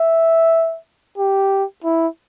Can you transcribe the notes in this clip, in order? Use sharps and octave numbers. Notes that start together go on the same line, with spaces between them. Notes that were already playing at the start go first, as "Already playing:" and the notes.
Already playing: E5
G4
E4